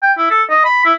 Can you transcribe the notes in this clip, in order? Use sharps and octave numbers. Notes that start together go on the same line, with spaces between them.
G5
E4
A4
D#5
B5
E4